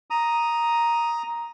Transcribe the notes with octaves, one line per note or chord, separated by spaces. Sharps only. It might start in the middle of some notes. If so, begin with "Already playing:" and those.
A#5 D#6